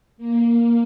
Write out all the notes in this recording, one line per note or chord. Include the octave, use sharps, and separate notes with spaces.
A#3